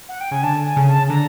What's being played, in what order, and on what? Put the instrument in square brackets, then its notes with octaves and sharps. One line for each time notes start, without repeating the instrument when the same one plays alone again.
[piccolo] F#5
G5
[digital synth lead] C#3 [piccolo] G#5
[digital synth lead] D3 [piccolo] A5
[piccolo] G#5
[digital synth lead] C#3
[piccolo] A5
[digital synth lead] D3 [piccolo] A#5